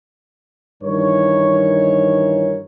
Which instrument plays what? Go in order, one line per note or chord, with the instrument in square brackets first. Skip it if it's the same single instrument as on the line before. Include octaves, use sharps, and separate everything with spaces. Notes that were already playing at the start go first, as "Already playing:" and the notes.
[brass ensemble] G2 D#3 E3 A#4 C#5